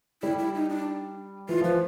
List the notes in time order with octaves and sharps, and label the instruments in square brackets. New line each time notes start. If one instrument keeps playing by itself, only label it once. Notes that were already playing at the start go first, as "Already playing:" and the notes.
[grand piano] G3 [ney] E4
[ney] E4
D#4
D4
[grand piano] E3 [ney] F4
[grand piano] F3 [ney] B4